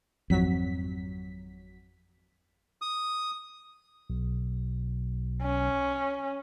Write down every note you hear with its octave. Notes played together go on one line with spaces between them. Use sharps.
G#1 F2 F#3 B6
D#6
B1
C#4